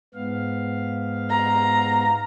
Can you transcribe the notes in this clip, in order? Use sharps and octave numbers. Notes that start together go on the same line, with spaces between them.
G#2 B3 F5
A#5